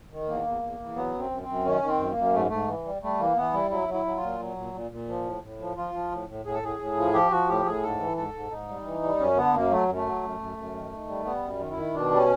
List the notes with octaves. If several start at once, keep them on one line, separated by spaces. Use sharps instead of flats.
D#3
E2 A#3
E2
E2
E2
F#3 B3
F#2
C4
F#2
C4
F#2
D#3 C#4
D#3
C4
F#2
A#3
F#2
G#2 A3
G#2 A3
E3
G3
G3 A3
E3 A#3
E3 B3
G3 E4
F#3 E4
F#3
E4
F#3
F4
A#2
F#3
A#2
A#2
A#2
F3
A2
A2
F3
F3 F4
F3
A2
A2
A2 G#4
A4
A2 G#4
A2
F3
F3 G4
F3 F#4
A2 G4
A2 G#4
G#2 A4
E3
G#2 A4
G#2
G#2 D#4
G3
E3
G3
F#2 C#4
D3 B3
F#2 A#3
F#3 A3
F#2
A3
F#3
F#2
F#2
F#2
D#3
D#3
G3
G3 B3
F#2
D#3
E4
D#3
B2 D4
G3
C#4